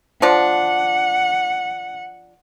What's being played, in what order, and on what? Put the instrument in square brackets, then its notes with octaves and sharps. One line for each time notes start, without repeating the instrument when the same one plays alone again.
[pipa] F3 D4 [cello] F#5